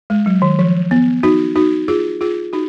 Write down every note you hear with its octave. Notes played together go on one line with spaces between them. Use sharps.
G#3
F#3
D#3
F3
B3
D#4 F#4
D#4 F#4
F4 G#4
F4 G#4
D#4 F#4